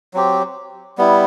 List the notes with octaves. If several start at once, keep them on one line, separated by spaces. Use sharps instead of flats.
F#3 C4 G4
G3 B3 E4